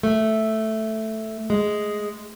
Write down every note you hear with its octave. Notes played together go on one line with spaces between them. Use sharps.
A3
G#3